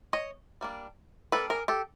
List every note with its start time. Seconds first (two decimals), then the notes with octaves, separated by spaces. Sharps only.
0.13 C#5 D#5
0.61 G3 A#3 D4
1.32 G3 A#3 D4 A4 B4
1.50 G#4 A#4
1.68 G4 A4